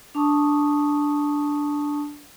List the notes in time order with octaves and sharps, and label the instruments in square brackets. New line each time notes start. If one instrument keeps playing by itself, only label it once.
[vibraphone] D4 A5 C#6 D#6